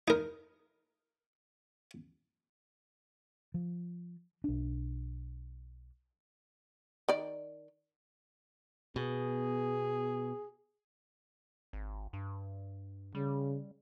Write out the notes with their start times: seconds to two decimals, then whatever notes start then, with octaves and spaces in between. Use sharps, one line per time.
0.08 D#4 A#4
3.54 F3
4.44 B1 D4
7.09 D#3 D5
8.96 B2 B3 G#4
11.73 G#1
12.13 G2
13.15 C#3 G3